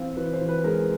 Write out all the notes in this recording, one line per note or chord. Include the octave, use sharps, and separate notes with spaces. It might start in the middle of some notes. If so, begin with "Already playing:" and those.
Already playing: E3 C4 F5
E3 B4
C5
E3
B4
B4
G#3 A#4